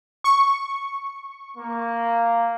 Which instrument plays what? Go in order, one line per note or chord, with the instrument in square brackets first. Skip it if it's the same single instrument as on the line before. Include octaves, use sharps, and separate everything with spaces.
[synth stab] C#6
[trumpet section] A#3